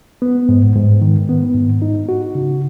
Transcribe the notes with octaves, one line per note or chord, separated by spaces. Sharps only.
B3
G#2
G#2
D#3
B3
G#2
D#4
F#4
C#3